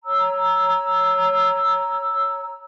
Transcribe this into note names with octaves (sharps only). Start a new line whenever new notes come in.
C#5 A#5 E6